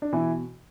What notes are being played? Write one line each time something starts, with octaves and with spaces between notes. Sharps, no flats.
D4
B2 E3 E4